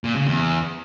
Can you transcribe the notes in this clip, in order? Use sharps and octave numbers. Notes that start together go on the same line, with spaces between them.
A#2
C#3
E2